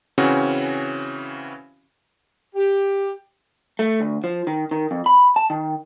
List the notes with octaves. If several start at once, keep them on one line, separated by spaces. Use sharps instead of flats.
C#3 E3 C4 C#4 F#4
G4
A3
D2
F3
D#3
D#3
F2
B5
A5
D#3